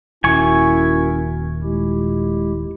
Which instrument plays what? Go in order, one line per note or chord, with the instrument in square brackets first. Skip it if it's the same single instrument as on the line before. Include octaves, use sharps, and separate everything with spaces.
[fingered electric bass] D#1 [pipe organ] C#4 F#4 A#4 [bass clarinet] E4 [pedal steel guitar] G#5 C#6
[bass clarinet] A#2 [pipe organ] G#3 E4 G4